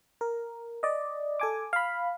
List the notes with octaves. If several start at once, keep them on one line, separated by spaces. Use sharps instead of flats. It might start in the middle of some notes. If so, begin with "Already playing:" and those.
A#4
D5 D#5
A4 G#5 D6
F5 B5